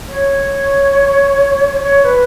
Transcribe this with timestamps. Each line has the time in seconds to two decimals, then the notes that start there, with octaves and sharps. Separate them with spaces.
0.09 C#5
1.82 C#5
2.01 C#5
2.04 B4